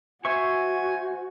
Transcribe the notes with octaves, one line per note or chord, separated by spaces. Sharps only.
F#4 C5 E5 G#5 C#6